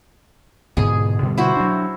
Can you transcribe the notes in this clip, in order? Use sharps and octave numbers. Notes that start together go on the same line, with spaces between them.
G#2 B2 D3 G#4
B2 D3 G3
E4 F#4 C5
F#3 D4